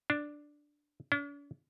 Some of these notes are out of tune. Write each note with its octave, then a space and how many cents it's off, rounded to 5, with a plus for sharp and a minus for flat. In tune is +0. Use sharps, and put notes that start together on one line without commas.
D4 +5
D4 -45